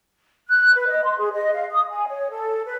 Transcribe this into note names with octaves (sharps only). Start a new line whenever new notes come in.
F#6
B4
D#5
C6
G#4
D#5
F5
D#6
G#5
C#5
A4
B4